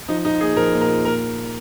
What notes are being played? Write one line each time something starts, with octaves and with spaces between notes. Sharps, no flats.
F3 D#4
F3 D#4
A#2 G#4
F3 A#4
A#2
A#4
A#2
A#2 A#4